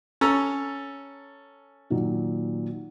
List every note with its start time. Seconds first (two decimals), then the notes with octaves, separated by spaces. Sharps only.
0.21 C#4 A4 A#5
1.90 A#2 D#3 F#3